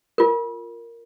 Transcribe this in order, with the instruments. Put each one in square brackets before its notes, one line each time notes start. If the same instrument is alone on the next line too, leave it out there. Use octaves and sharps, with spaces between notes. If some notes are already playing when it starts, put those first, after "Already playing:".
[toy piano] F4 A#4